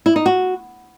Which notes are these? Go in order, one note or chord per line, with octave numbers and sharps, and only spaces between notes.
E4
D#4
F#4